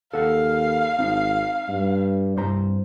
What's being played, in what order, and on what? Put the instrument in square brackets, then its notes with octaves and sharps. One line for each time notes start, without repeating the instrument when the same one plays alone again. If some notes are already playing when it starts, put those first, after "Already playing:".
[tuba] D#2 [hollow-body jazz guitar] A4 F#5 [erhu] F5
[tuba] G#1 [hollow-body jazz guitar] C4 D#4
[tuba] G2
[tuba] C2 [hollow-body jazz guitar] G2 C5 A#5